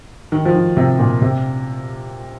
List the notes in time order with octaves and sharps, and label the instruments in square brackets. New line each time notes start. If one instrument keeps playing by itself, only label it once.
[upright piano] D#3
F3
D#3
C3
A#2
C3